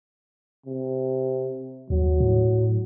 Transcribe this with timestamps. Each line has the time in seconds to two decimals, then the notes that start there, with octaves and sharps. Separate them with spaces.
0.66 C3
1.90 D#2 F#3
2.20 A2